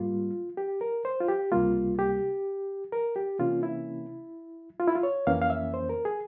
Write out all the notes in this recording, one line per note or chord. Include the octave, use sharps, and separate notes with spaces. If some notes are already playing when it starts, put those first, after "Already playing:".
Already playing: G#2 G3 A#3 F4
G4
A#4
C5
F4
G4
C#2 C3 G3 A#3 F4
G4
A#4
G4
C3 E3 A#3 C#4 F4
E4
F4
E4
F4
C#5
F2 E3 A#3 C#4 F5
F5
E5
C5
A#4
G#4